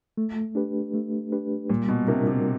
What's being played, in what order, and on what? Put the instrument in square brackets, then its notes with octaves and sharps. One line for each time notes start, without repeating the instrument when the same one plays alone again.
[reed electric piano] A3
D4 G4 B4
A3
D4 G4 B4
[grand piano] A#2 [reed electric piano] G3
[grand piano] B2
[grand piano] C3 [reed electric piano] B3 D4 F4 A#4
[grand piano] C3